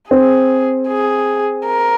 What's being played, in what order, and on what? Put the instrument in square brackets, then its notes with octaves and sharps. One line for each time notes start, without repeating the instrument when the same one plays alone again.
[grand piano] C4 [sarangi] G#4
[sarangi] G#4
A#4